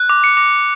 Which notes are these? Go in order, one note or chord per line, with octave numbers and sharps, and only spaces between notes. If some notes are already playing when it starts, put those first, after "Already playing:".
Already playing: F#6
D6
C#7
D6